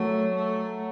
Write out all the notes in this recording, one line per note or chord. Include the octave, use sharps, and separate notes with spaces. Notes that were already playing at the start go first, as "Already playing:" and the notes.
Already playing: F#3 A3
A3